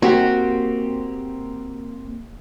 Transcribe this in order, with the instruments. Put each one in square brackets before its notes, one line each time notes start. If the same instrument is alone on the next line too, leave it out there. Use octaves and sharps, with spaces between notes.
[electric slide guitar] A#3 C4 G4 [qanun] F#4